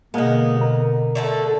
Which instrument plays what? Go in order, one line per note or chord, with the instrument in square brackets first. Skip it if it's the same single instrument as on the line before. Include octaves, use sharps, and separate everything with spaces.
[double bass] B2 D3 [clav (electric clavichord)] G#3 A#3 [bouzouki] B3 D#4
[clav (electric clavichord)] A#4
[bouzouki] D3 A3 A4